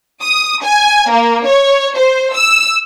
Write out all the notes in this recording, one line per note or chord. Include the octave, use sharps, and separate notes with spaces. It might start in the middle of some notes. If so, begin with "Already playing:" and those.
D#6
G#5
A#3
C#5
C5
E6